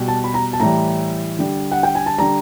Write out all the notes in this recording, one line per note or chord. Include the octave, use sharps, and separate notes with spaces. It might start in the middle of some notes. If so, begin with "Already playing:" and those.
Already playing: B2 G3
A5
B5
A#5
A5
A2 E3 G3 A#5
D3 G3
F#5
G5
G#5
A5
D3 G3 A#5